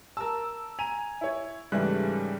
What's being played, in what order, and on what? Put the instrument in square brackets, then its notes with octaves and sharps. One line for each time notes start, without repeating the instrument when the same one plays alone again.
[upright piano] A#4 A5 [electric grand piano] E6
[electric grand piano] G#5 [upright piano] A#5 D#7 F7
[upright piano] E4 C#5
[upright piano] G#2 E3 A3 [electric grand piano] C#3 G3 F#6